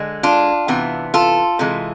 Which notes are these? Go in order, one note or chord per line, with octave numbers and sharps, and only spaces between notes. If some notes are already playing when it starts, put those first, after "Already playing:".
Already playing: D3 G#3
D4 F4
C3 E3 B3
F4 A4
C3 E3 G#3